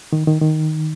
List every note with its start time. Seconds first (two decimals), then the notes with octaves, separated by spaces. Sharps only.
0.13 D#3
0.27 D#3
0.42 D#3